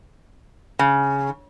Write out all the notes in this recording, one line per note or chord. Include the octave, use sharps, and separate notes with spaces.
C#3